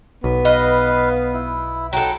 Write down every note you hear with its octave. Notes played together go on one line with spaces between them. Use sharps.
B1 B3
B4 D#5 F5
E4
F#3 D#4 A4 G5